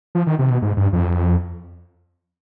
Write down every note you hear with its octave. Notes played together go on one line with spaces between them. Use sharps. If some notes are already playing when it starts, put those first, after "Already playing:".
F3
D#3
C3
B2
G#2
G2
F2